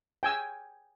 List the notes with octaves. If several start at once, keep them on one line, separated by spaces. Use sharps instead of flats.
G5 G#5 E6